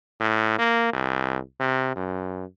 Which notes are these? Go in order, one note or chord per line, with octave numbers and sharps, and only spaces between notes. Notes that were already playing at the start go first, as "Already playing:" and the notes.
A2
A#3
C2
C3
F#2